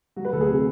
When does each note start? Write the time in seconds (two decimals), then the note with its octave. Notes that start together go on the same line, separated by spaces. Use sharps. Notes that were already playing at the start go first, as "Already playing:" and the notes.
0.16 F#3 F#4
0.25 B4
0.33 D2 A4
0.41 G#4
0.49 C3